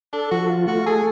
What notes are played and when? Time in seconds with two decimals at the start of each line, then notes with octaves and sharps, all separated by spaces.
0.13 D4 A4
0.31 F3 F#4
0.50 F4
0.67 A3 F#4
0.86 G#4 A4